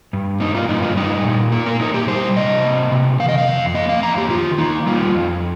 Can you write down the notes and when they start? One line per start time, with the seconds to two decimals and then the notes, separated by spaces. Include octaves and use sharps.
0.13 G2
0.40 A#3 D#4
0.55 F4
0.69 G2 D#4
0.83 F4
0.96 G3 D#4
1.25 A#2
1.52 A#3 F4
1.66 A#4
1.80 A#2 D#4
1.94 G4
2.08 G3 C5
2.36 C3 D#5
2.64 A#3
2.91 C3
3.20 D#3 F5
3.29 D#5
3.38 F5
3.47 F2
3.75 A#3 D#5
3.89 F5
4.03 F2 A#5
4.18 G4
4.30 D#3 F4
4.58 A#3 D#4
4.86 G3 F4
5.15 F2